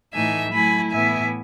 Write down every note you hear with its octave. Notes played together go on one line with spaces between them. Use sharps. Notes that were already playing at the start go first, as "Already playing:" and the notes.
A2 E3 A3 D#4 E5 G#5
F#3 A3 E4 G#5 B5
A2 E3 B3 E4 E5 G#5